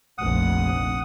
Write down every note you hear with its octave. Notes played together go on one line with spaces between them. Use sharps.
F1 A#1 F#5 D#6